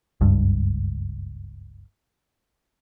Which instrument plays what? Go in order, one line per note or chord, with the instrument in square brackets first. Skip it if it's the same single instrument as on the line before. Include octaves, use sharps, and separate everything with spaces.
[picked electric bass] F#1 C#2 G2